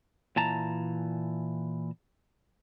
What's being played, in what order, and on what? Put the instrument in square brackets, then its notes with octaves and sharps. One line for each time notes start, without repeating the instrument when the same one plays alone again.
[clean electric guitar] A#2 E3 A5 A#5